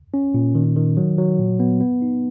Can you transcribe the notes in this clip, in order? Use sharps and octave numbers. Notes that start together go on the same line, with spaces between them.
C#4
A#2
D#3
D#3
F#3
F#3
A#2
B3
B3
D#4